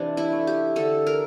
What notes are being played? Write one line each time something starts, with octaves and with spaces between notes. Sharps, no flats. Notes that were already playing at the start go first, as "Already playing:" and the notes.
Already playing: C3 E3 D4
E4
A3
G4
D3 A4
A#4